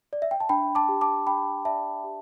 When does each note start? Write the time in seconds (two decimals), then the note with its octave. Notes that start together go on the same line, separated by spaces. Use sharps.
0.13 D5
0.22 E5
0.31 G5
0.40 A5
0.49 D4 G5 B5
0.75 A5 D6
0.89 G4
1.01 A5 D6
1.27 D4 G5 B5
1.65 D5 E5 A5
2.04 G4